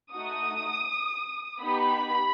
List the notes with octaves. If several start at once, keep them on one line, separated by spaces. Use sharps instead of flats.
A3 D#4 F#4 D#6
B3 D#4 G4 B5